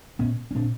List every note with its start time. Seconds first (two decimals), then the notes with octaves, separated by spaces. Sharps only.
0.19 A#2 B3 C#4
0.51 C#4
0.55 A#2 C4 D4